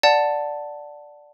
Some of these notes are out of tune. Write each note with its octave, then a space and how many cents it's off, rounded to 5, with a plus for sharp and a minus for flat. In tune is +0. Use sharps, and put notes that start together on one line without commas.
D5 +0 F#5 -15 A5 +5